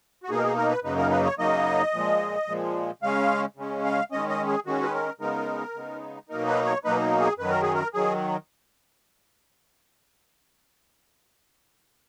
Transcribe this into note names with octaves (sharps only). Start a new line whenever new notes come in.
F#4
B2 A#3 D#4 G#4
A#4
G#4
A#4
B4
F#2 C#3 F#3 A#3 D#4 B4
A#4
B4
C#5
F#2 C#3 F#3 A#3 D#4 D#5
A#2 F3 G#3
A#2 F3 G#3
C#3 G#3 C#4 F5
C#3 G#3 C#4
F5
D#3 G#3 C#4 D#5
D#5
G#4
D#3 G#3 C#4 F#4
B4
A#4
C#3 G#3 B3 D#4 A#4
C#3 G#3 B3 D#4
B2 F#3 A#3 D#4 A#4
B4
C#5
B2 F#3 A#3 D#4 B4
G#4
F#2 D#3 F#3 B4
A#4
G#4
A#4
D#3 F#3 G#4